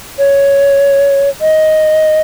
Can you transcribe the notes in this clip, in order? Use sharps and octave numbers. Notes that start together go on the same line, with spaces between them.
C#5
D#5